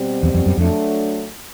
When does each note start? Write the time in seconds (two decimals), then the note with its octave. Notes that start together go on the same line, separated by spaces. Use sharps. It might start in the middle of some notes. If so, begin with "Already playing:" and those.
Already playing: B2 G3 C4
0.23 E2
0.34 F2
0.46 F#2
0.57 F2 F#3 A3 D4